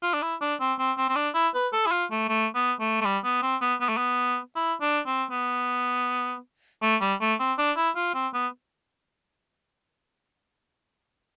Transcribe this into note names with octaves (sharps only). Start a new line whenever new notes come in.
F4
D4
E4
D4
C4
C4
C4
C4
D4
E4
B4
A4
E4
F4
A3
A3
B3
A3
A3
G3
B3
C4
B3
B3
A3
B3
E4
D4
C4
B3
A3
G3
A3
C4
D4
E4
F4
C4
B3